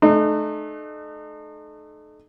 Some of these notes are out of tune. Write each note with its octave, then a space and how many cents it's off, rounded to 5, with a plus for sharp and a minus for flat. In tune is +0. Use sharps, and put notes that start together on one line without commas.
A3 -35 D#4 -40